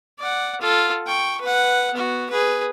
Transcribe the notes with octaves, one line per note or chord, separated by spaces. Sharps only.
D5 F#5
F4 A4
G5 C#6
B4 F#5
B3 F#4
G#4 B4